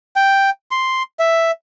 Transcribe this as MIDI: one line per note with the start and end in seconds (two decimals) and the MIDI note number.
0.16 0.50 79
0.71 1.03 84
1.19 1.51 76